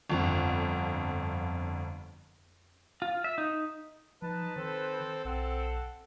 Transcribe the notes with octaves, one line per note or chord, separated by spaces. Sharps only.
G1 F2 D3
F4
E5
D#4
F3 D#4 B4 A5
D#3 C4 A4 C5
B1 C4 A4 F#5